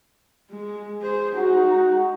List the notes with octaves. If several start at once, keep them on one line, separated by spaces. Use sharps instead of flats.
G#3
G#4 C5
G#3 D#4 F#4